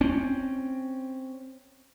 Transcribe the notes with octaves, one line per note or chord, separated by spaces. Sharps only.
C4 C#4